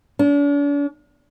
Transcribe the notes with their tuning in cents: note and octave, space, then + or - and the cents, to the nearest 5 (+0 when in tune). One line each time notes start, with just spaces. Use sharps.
D4 -45